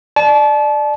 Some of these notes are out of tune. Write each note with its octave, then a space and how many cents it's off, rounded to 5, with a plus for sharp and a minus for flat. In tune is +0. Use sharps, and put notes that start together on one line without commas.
D5 +20 A5 -30